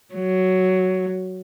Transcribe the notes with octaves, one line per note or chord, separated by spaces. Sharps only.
F#3